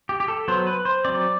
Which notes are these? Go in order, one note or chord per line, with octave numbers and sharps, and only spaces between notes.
G4
G4
A4
F#3 B3 C5
B4
C5
F#3 C4 D5